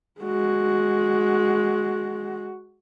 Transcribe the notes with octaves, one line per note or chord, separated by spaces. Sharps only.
G#3 F#4